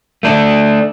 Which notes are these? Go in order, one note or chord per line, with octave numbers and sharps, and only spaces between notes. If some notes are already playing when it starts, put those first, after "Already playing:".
A3 D4